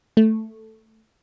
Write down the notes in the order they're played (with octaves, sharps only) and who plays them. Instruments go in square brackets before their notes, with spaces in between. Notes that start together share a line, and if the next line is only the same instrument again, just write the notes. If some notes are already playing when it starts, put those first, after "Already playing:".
[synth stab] A3